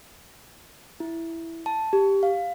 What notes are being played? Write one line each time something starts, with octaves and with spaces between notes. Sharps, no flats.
E4
A5
G4
F5